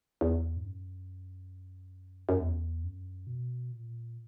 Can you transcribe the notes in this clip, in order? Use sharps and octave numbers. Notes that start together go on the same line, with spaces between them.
E2
G#2
F#2
F#2
E2
F#2
B2
A#2